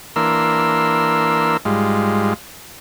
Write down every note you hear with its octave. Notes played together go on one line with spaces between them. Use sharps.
E3 A#3 D4 A#4 C6 E6
G#2 G3 G#3 F4